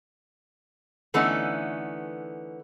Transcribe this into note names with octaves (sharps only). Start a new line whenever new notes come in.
D3 E3 A3 B3 C#4 D#4